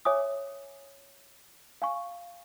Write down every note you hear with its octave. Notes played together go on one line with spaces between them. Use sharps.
C#5 E5 G#5 D6 D#6
F5 G#5 C#6